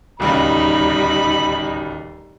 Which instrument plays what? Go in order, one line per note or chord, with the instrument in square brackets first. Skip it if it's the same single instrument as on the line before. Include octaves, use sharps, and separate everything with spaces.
[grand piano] D1 D#2 C#3 [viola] G3 D#4 [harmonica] B5